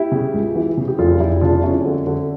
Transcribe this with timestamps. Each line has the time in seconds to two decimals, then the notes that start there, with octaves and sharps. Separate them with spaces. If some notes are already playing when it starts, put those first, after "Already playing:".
Already playing: E4 G4
0.12 C#3
0.34 C#2
0.55 E3
0.77 C#3
0.88 G4
0.99 F1 F4 A4
1.20 F1 E4 G4
1.41 C#3 D4 F4
1.63 F2 C#4 E4
1.85 D3
2.07 D3